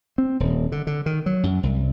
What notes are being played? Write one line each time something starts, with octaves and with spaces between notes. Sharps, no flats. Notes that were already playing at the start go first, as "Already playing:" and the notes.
C4
D#1
D3
D3
D#3
F#3
F#2
C2